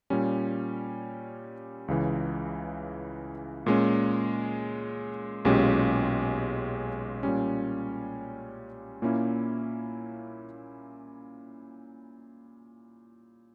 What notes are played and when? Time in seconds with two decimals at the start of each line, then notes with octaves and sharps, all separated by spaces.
0.10 A#2 G3 C#4
1.88 C#2 C#3 E3
3.66 A#2 G#3 C#4
5.45 B1 A#2 G#3 C#4 G4
7.23 A#2 G3 C#4
9.02 A#2 A#3 C#4 E4